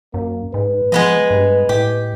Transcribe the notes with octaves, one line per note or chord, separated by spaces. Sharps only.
F#2 A#3
G#2 B4
F3 G#3 B3 D#5
G2
A2 G4